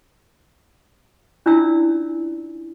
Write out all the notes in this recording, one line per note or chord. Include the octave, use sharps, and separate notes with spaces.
C#4 D4 E4 F4 D5 E6